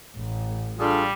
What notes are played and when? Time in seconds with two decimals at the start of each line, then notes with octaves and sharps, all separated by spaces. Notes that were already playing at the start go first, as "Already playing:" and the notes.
0.17 A1
0.79 G3 D4 F4 G#4 A4